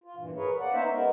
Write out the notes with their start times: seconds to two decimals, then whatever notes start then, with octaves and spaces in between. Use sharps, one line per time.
0.04 F4
0.16 G2 A#2 E3
0.35 G#4 A#4 B4 C#5
0.60 A#3 D5 F#5
0.73 B3 C#4 D#4 C5 C#5 E5
0.90 G#3 B3 A#4